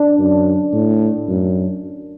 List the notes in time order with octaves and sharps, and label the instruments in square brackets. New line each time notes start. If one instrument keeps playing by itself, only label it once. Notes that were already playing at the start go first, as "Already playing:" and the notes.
Already playing: [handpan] D4
[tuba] F#2
A2
F#2